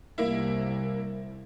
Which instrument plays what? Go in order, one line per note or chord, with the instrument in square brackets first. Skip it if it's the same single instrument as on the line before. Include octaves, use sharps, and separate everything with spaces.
[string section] C2 [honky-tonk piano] A#3 E4